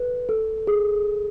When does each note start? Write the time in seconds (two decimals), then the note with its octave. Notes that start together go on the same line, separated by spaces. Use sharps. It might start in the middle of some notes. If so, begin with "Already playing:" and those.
Already playing: A4 B4
0.29 A4
0.67 G#4